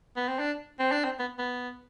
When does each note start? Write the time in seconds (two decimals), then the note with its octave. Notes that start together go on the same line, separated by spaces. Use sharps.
0.17 B3
0.28 C4
0.39 D4
0.80 C4
0.92 D4
1.05 C4
1.19 B3
1.39 B3